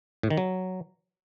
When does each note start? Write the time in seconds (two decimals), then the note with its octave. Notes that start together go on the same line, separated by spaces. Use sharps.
0.23 A2
0.30 D#3
0.37 F#3